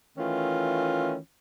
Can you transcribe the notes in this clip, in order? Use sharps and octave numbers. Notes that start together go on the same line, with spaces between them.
D#3 E3 A3 C#4 F4